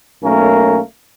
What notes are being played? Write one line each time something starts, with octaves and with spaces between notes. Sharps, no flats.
B1 A3 A#3 C#4 A#4